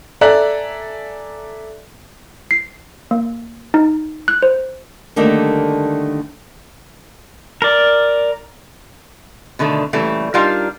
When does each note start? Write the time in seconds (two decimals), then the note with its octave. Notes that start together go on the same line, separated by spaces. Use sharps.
0.21 A4 D5 E5 G#5 A#5 F#6
2.51 C7
3.11 A#3
3.74 D#4
4.28 F#6
4.43 C5
5.16 D3 D#3 G3 A3 A#3
7.62 A#4 D5
9.59 B2 D3 D#3 A3
9.93 A#2 C#3 E3 G3 A3
10.34 G3 D4 D#4 F4 A#4 F5